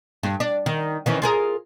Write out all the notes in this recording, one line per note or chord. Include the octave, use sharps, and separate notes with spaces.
G2
D4
D#3
D#3 E3 C#4
F4 G#4 A#4